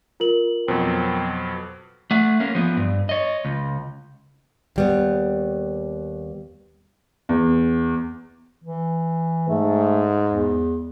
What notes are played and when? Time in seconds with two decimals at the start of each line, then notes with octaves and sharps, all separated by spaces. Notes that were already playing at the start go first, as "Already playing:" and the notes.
0.20 F4 A#4 F#7
0.68 F2 B2 F#3 C4
2.11 A3 F#5
2.40 A#3 C#4
2.55 F3 B3
2.77 G2
3.09 C#5 D#5
3.45 C#2
4.76 D#2 G3 B3
7.29 E2
8.64 E3
9.48 G#2 A3
10.32 E2